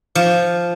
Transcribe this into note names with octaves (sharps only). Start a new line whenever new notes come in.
F3